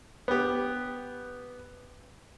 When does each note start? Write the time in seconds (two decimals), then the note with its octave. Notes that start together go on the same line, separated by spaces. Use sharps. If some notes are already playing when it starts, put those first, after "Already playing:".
0.28 B3 G4